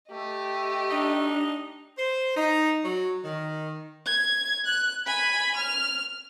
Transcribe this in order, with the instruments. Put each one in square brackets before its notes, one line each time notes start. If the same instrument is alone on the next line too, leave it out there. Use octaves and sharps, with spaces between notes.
[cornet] A3 [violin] G4 D#5
[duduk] D4 [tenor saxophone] D#4
[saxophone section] C5
D#4
F#3
D#3
[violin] G#6
F#6
G#5 B5
F6